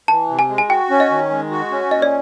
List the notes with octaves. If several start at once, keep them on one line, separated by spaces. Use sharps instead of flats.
E3 A5
C3
G#5
G#3
G#5
F#4 G5
C#4
D#5
D#3
G#3
F#4
C#4
A#2 D#5
D5